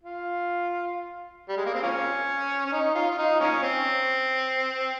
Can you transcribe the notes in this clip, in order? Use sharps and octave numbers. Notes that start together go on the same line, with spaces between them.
F4
G3
G#3
A#3
C4
F3 A#3 C#4
C#4
D#4
F4
F4
D#4
F3 A#3 C#4
C4